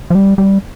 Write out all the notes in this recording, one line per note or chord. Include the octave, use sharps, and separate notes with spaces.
F3
G3
G3